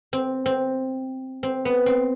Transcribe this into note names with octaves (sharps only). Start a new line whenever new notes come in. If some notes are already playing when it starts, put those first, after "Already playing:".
C4
C4
C4
B3
C4